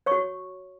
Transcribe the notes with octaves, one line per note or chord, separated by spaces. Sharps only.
C#5 C#6
F#4